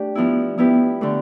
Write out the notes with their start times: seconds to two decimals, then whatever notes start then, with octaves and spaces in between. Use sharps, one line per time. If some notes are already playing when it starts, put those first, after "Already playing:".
Already playing: A3 D4 G4
0.15 F3 B3 E4
0.58 F3 B3 E4 G4 B4
1.01 D3 A3 D4